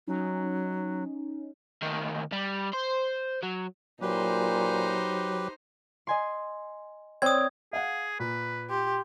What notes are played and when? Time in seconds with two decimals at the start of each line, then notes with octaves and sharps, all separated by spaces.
0.07 F#3 C#4 D#4
1.82 D2 D#3
2.32 G3
2.73 C5
3.43 F#3
4.01 A#2 F#3 D#4 G4 B4 C5
6.07 D#5 G#5 C6
7.22 C4 C#5 D5 D#6 G#6
7.73 G#4 F5 F#5
8.20 A#2 B4
8.70 G4 C6